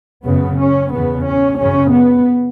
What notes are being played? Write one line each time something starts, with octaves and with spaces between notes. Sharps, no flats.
F#2 C#3 B3
C#4
E2 C#3 B3
C#4
F#2 C#3 C#4
B3